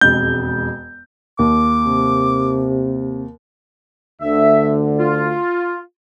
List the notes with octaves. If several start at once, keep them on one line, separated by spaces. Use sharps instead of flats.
E1 F2 G#3 G6
D#2 D6
C3
D2 D3 E5
F4